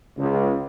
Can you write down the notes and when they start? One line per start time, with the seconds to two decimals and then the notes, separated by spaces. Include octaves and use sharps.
0.17 C#2